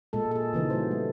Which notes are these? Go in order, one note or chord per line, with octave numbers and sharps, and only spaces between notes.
A#2 G#3 A4
G#4 A4
A#2 C#3 E3 D#4
G3 F#4 C5
A3